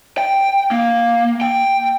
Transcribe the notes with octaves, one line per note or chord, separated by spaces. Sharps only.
G5
A#3
G5